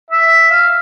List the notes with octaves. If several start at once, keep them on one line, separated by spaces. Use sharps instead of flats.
E5
F5